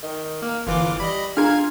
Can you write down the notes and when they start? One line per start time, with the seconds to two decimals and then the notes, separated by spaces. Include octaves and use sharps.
0.03 D#3
0.42 A#3
0.67 G1 E3 F4 D6
1.00 G3 D#5 B5
1.37 D4 F4 G#4 A#5 F6 G#6